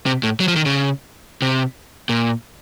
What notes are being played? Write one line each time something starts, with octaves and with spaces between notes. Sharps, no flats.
C3
A2
F#3
F3
D#3
C#3
C3
A#2